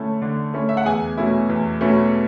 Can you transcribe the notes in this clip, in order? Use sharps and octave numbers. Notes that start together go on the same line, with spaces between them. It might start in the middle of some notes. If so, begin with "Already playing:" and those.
Already playing: D3 A3 C#4 E4 A5
D3
A3 C#4 E4
E5
F#5
E2 G#4 G#5
B2 A3 C#4 E4
E2
B2 A3 C#4 E4